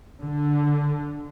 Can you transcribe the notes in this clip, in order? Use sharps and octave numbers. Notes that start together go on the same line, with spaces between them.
D3